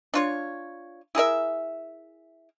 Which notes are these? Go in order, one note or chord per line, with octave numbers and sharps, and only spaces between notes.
D4 F4 C#5
E4 G#4 A#4 E5